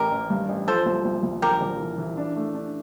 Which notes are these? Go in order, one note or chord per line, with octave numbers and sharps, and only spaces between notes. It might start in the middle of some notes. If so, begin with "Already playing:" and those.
Already playing: A1 G4 A#4
A1
G2
A1
F3 A4 C5
C2
C2
C2
A#1 G4 A#4
A#1
E3
E3
D4
A3
D4